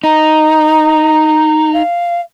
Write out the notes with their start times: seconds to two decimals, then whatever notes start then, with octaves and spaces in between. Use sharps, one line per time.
0.04 D#4 A#5
1.74 F5